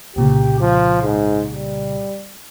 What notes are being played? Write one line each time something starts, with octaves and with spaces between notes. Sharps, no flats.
C2 A#2 C#3 G4
F3
G#2
G3